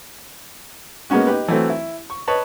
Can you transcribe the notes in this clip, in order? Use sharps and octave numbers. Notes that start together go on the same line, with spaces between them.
G#3 A#3 B3 C#4 F#4
D#4 G4 B4
E3 F#3 A3 C4
E4
C#6
B4 C#5 D#5 A5 B5